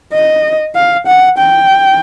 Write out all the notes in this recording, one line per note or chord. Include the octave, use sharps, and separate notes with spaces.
D#5
F5
F#5
G5